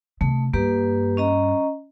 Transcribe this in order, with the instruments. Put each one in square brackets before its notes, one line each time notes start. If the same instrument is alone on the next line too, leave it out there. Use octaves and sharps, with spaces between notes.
[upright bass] C3 D#3 [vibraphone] A3
[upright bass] G2 [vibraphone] A#3 G4 B4
[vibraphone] C#4 D#5 A#5